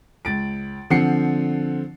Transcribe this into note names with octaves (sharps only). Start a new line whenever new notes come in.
C#2 A6 D7
D3 F3 C4 F#5 C7 C#7